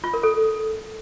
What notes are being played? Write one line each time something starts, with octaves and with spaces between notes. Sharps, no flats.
F4
A#4
A4